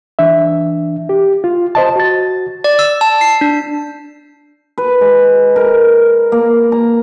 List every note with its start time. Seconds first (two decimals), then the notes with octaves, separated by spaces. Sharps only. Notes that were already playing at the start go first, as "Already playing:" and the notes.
0.19 E3 D4 E5
1.09 G4
1.44 F4
1.75 C5 D#5 A5
1.96 F#4 A6
2.64 D5
2.79 E6
3.01 A5
3.21 C7
3.41 D4
4.78 B4
5.01 G#3
5.56 A#4
6.32 A#3
6.72 A#5